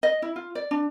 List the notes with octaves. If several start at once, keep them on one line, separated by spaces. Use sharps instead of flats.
D#5
E4
F4
D5
D4